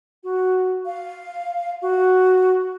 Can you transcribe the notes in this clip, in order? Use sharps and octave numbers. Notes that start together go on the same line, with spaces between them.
F#4
F5
F#4